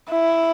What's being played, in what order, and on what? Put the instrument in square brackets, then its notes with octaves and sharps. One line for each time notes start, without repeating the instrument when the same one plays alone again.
[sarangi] E4